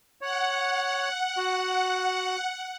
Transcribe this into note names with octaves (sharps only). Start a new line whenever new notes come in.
C#5 F#5
F#4